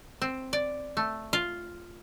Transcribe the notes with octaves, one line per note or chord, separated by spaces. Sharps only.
C4
D5
A3
F4